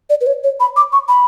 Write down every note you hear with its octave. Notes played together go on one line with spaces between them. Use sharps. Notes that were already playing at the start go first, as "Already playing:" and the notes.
D5
B4
C#5
C#5
B5
D6
C#6
B5